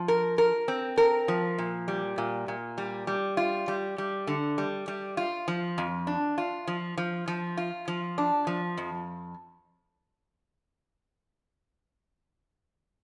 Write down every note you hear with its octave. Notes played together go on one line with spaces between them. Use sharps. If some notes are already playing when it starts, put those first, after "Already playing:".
Already playing: F3
A#4
A#4
C4
A#4
F3
A#2
G3
A#2
A#2
G3
G3
F4
G3
G3
D3
G3
G3
F4
F3
F2
D4
F4
F3
F3
F3
F4
F3
D4
F3
F2